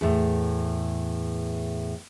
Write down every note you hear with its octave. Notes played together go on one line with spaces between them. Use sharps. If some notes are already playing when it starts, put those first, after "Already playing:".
E2 A2